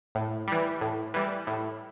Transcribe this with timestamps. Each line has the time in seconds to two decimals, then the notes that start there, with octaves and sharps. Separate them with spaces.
0.15 A2
0.48 E3 G3
0.81 A2
1.14 E3 G3
1.47 A2